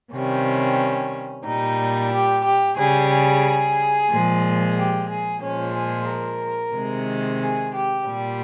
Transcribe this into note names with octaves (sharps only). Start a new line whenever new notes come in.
C3 D#3 G3 C#4
A#2 G3 D#4
G4
G4
C#3 G3 G#4
G#4
A#2 F3 G#3
G4
G#4
A#2 F3 G#3 C#4
G#4
A#4
C3 D#3 G#3
G#4
G4
A#2 G3